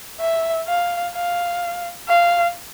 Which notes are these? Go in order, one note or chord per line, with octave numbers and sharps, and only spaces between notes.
E5
F5
F5
F5